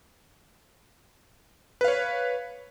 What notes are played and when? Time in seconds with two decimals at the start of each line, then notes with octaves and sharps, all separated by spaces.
1.81 B4
1.84 F5
1.88 C#5